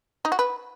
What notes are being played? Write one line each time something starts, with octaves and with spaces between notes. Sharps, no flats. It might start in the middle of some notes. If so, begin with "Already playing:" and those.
D#4
F#4
B4